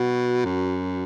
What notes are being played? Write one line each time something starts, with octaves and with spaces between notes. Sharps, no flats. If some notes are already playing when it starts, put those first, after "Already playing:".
Already playing: B2 F#4
F#2